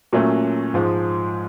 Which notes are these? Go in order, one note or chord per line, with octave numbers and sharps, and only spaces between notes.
A#2 F#3 A3 C#4
G#2 F3 G#3